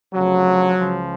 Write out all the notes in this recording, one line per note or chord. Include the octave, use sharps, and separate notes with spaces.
D2 C#3 F3 F#3
C#2 C#3 F3